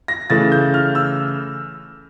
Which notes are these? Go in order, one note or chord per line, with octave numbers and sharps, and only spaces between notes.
A#6
C#3 E3 A3 A6
G6
F6
E6